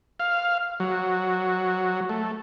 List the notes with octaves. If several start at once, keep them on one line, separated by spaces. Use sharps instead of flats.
F5
F#3
A3